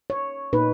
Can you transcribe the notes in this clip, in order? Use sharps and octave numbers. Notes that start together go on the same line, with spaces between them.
C#5
A#2 A#3 D#4 B4